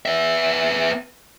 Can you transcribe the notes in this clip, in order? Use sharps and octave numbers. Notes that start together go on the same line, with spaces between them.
B3 E5